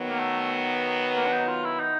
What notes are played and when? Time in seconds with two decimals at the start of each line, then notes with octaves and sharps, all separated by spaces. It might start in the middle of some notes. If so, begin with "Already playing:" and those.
Already playing: D#3 F#3 B3
0.09 A#3
0.19 A3
1.16 A#3
1.26 D4
1.32 D#4
1.48 F4
1.64 E4
1.80 D#4